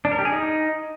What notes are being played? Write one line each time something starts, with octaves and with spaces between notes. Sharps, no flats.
D4
A#4
G4
G#4
D#4